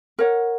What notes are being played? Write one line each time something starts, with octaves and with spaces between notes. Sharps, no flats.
A#4 C#5 F#5